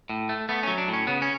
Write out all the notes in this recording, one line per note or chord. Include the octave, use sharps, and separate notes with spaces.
A2
A3
A3 B3
F#3 C#4
D4
A2
C#4
C#3 B3
C#4